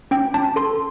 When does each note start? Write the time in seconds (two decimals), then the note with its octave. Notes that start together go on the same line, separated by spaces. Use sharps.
0.11 C#4 G5
0.34 C#4 A5
0.56 A4 C6